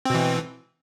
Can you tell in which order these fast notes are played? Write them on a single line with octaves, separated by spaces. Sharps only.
C4 B2 E3